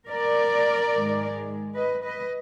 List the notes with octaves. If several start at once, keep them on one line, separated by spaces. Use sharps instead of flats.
A#4 D5
G#2 D#3 G#3
B4 D#5
B4 D#5